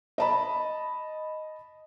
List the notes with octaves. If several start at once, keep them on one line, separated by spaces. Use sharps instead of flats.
D#5 A5 B5